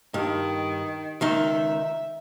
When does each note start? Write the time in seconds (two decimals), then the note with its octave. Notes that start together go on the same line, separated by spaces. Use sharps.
0.14 G2 D#3
1.21 C#2 D#3 D#4 E5